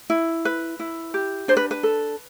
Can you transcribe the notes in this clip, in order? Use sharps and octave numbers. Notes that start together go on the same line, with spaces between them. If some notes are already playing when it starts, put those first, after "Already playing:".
E4
B4
E4
G4
D4 C5
B4
B4
A4